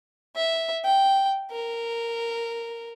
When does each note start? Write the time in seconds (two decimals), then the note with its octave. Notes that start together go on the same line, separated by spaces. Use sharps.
0.36 E5
0.85 G5
1.51 A#4